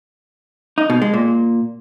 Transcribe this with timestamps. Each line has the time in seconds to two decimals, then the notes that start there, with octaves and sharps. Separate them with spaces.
0.78 D#4
0.90 B2
1.02 G#3
1.14 A#2